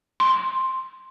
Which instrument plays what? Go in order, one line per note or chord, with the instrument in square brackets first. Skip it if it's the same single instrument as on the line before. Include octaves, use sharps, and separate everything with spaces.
[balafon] C6